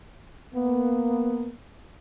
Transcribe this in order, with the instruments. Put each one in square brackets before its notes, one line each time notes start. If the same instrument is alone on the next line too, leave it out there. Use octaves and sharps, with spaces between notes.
[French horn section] A#3 B3